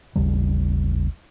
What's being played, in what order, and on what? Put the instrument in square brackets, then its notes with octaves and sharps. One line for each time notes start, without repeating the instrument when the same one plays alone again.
[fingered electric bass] G#1 D#2 C#3 G3